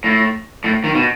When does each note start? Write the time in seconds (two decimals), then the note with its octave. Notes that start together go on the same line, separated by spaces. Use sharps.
0.04 A2
0.64 A2
0.84 D#3
0.95 B2